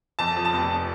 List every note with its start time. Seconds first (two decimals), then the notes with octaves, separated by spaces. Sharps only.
0.19 F2 A5
0.37 F3
0.45 A5
0.53 F1